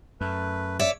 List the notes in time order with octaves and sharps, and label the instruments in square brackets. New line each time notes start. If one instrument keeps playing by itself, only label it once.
[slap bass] F#2 [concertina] A3 B4
[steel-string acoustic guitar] C#5 D5 E5